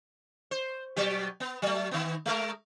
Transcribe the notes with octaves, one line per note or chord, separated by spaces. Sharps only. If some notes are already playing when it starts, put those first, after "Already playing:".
C5
B2 F#3 G4
B3
F#3 A3
D#3 B3
G#3 A3 A#4